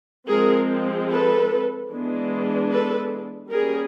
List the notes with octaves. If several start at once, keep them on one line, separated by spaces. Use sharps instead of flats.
F3 G#3 C4 G#4 A#4
A4 B4
E3 G#3 B3 D4
A4 B4
G3 A#3 C#4 G#4 A#4